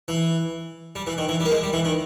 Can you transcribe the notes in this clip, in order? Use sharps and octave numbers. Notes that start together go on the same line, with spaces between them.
E3
G3
E3
D#3
E3
G3
A#3
G#3
G3
E3
D#3